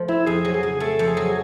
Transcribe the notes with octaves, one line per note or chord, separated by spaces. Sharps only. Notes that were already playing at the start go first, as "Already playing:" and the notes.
Already playing: F3 A3 F4
C4 E4
F2 G#4
F#3
G#4
C#3
A3 A4
F2
G#4
F#3